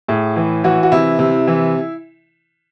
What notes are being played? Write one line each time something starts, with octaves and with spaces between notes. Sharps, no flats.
A2 G#4
E3
E3 F#4
F#4
C3 E4
C3
E3